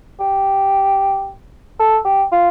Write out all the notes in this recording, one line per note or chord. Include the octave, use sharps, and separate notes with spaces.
G4
A4
G4
F4